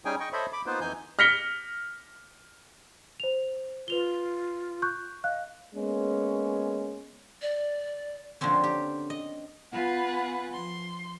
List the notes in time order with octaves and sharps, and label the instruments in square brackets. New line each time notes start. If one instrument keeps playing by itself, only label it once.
[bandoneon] G3 C#4 D#4 G#4 G5 G#5
D#5 G5 C#6
A4 C5 C#5 D#5 E5 B5
B5 D6
A#3 B3 D#4 F4 B4 C5
F2 E3 D#4 G#5 G6
[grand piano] F6 A#6 B6 C#7 G7
[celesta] C5 F7
[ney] F4 [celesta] B4 F7 G7
[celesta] C#6 F#6 G6
[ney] D#5 [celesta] F5 F#6
[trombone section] G#3 A#3 B3 C#4
[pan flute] D5
[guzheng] D3 F3 A#3 C4 C#4
G4
D#5
[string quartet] B3 F4 B4 F#5 G#5
F3 C6